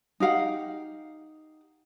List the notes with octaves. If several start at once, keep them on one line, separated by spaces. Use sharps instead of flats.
D#4 G4 F5 F#5